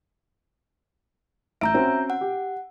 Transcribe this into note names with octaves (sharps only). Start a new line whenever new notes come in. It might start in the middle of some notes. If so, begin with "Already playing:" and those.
A1 E5 A#5 E6 G6 D7
C4 C#4 F#4
F#5
G4